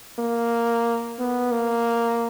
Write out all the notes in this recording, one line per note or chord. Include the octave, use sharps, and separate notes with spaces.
A#3
B3
A#3